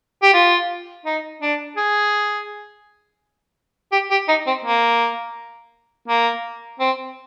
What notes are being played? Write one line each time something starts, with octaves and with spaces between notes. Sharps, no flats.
G4
F4
D#4
D4
G#4
G4
G4
D#4
C4
A#3
A#3
C4